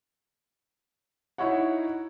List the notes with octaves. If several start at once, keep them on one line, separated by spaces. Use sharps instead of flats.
D#4 E4 F#4 C#5 F#5